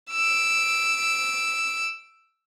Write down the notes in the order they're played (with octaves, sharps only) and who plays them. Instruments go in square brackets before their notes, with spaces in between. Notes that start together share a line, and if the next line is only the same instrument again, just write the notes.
[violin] E6 D7